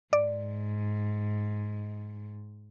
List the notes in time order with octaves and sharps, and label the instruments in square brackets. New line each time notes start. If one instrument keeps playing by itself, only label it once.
[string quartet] G#2 [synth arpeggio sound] D5